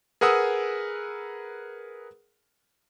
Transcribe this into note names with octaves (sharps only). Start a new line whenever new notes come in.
G#4 A#4 B4 F#5 D#6 E6